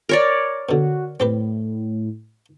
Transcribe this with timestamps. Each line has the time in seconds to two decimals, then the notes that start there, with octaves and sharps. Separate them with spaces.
0.09 A#4 C#5 D5
0.69 B2 D3 F#4
1.20 A2 C4 G4 B4